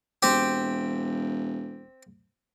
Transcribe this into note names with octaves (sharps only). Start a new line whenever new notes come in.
E1 C4 G4